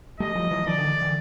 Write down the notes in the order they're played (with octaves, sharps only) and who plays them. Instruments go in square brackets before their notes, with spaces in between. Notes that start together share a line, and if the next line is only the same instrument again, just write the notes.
[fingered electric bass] G3 A3 [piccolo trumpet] D#5
[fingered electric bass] F3 G3
E3 F#3
[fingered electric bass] D#3 F3 [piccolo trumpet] D5
[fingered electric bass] D3 E3
D3 E3